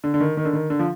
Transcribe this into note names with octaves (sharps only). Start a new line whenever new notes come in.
D3
D3
D#3
D#3
D3
D#3
D3
F3